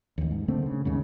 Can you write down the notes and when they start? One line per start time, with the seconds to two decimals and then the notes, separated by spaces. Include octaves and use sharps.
0.18 A1 D#2
0.31 G#2
0.48 D3 A3 A#3 C4
0.66 C#3
0.85 D#2 G#2 C#3